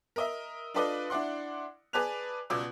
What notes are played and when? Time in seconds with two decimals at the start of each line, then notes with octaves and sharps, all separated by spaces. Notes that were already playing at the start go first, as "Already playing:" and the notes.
0.16 A#4 D#5 E5
0.74 D4 F4 A4 B4 D5 D#5
1.10 D4 E4 D5 F#5 C6
1.93 G#4 B4 D5 A5 F#6 F7
2.50 C#2 B2 D5 E6